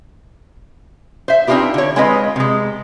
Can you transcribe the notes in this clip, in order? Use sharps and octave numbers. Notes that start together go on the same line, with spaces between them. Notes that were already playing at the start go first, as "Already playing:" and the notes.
C5 E5
C4 D4 D#4 F4 G4 B4
D3 C#5
G#3 C4 F4 B4 D#5
C3 G#3